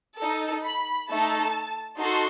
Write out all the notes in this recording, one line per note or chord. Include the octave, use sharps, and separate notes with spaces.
D#4 A4
B5
A3 D#4 A4 A5
D#4 F#4 A4 C6